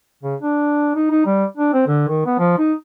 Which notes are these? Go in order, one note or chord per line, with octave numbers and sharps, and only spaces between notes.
C#3
D4
D#4
D#4
G3
D4
C4
D3
D#3
B3
F3
D#4